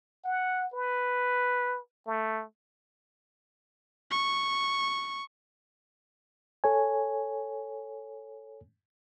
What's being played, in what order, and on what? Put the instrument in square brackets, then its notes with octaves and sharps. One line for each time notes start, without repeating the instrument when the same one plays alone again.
[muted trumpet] F#5
B4
A3
[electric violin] C#6
[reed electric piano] A4 C#5 G#5